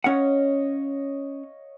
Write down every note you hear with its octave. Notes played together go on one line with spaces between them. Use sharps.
C#4 C#5 D#5 F5 F#5